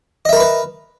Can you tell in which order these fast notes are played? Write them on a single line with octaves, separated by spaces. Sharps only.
D#5 E5 A#4 B5 B4